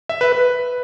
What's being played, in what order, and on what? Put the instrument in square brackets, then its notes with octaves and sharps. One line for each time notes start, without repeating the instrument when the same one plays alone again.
[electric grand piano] E5
B4
B4